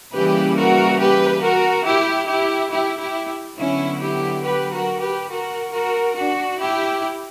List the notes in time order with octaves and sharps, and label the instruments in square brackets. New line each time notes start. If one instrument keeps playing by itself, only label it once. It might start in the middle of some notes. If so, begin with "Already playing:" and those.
[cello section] C#3 E3 G3 A#3 G4 B4
F#4 A#4
G4 B4
F#4 A#4
E4 G4
E4 G4
E4 G4
E4 G4
D3 F#3 B3 C#4 E4
E4 G4
G4 B4
F#4 A#4
G4 B4
F#4 A#4
F#4 A#4
D4 F#4
E4 G4